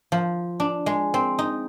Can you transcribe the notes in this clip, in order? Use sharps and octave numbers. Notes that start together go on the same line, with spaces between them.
F3
D4
G#3
C4
D#4